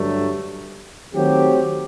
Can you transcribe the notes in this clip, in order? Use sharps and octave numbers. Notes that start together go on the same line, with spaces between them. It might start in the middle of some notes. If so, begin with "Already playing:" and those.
Already playing: G2 D3 F#3 A3
D#3 F#3 A3 C4 G4